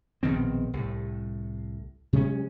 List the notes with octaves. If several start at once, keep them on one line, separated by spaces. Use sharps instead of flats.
A#1 B2 D#3 C4
C2 A2
C3 F#3 G#3 C#4